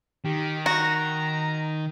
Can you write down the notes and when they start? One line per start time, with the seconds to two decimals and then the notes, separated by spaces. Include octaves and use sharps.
0.25 D#3 G4
0.66 F#4 A#5